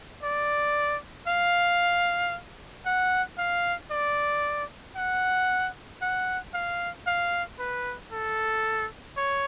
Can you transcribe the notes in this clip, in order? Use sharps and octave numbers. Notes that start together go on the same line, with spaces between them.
D5
F5
F#5
F5
D5
F#5
F#5
F5
F5
B4
A4
C#5